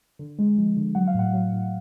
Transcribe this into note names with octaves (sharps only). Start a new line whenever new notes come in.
D3
G#3
F3
D3
F#3 F#5
F5
A2 F#5
F#3
A2